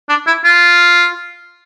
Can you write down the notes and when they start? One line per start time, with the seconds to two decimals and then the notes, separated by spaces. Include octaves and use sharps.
0.09 D4
0.27 E4
0.44 F4